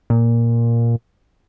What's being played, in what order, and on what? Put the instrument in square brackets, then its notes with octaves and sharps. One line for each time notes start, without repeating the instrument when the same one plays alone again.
[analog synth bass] A#2